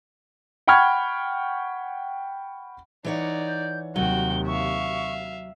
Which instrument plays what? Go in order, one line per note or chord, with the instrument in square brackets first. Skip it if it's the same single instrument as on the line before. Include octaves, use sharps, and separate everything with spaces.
[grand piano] F#5 G5 B5 C#6 F6 G#6
[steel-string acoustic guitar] E3 C#5 F#5 [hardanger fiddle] D#4 D5
[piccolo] G6
[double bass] D#2 C3 [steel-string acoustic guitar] F#3 [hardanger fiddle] F#4 G5 [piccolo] G7
[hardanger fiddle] E5 F5 [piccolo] C#6